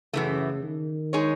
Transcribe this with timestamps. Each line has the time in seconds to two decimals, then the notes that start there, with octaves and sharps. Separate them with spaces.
0.13 F#2 C#3 E3 A3
0.63 D#3
1.13 G#3 D#4 G#4 C#5